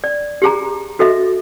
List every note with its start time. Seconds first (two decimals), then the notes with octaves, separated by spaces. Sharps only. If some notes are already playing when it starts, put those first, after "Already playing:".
0.04 D5
0.42 G4 G#4 A#5
0.99 F#4 A4 D#5 E5